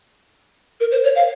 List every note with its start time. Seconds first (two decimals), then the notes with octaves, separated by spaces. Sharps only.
0.80 A#4
0.92 C5
1.04 C#5
1.15 F5